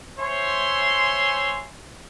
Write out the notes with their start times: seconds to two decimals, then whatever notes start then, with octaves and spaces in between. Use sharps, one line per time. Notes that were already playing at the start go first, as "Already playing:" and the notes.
0.19 C5 C#5 E5 G#5 C6